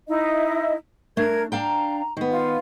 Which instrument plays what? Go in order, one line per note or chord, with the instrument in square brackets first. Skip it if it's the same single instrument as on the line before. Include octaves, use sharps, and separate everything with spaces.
[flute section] D#4 E4 D#5
[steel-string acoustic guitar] A3 D4 [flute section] A#4 G#6
[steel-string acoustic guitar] D4 F5 G5 [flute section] A#5
[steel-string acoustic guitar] D#3 B3
[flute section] F4